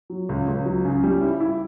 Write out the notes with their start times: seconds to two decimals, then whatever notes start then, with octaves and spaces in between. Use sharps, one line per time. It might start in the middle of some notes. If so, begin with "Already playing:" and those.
0.10 F#3
0.29 C#2
0.48 C#2
0.66 F#3
0.85 C#3
1.04 G3
1.21 E4
1.40 E4